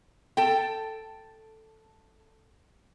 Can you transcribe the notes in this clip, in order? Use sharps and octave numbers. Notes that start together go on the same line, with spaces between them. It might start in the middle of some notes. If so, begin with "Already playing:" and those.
A4 G5